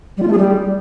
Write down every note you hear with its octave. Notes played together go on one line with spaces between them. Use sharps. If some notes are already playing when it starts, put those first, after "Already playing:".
G3
F4
A3
G#4
G3